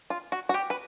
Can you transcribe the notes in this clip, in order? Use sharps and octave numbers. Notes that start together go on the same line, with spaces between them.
F4
F#4
F#4
G4
B4